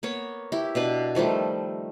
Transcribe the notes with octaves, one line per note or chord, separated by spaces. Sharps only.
A#3 B3 C#5
E4 G4
B2 D4 B4
D#3 F3 G3 A3